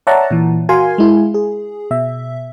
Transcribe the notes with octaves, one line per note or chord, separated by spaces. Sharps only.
C#5 D5 E5 F#5 A5 A#5
A#2 E3
F#4 A#4 F5 G#5 C6
G#3 E4
G#4
B2 E5